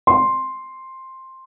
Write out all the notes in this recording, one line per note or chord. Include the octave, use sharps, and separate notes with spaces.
C6